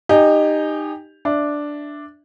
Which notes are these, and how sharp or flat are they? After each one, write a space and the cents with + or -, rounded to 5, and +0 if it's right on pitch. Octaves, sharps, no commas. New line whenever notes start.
D#4 -15 G4 +10 G#5 +0
D4 +0 E5 +0